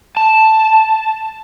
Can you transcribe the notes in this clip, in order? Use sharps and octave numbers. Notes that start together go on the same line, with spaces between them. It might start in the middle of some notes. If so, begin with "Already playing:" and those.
A5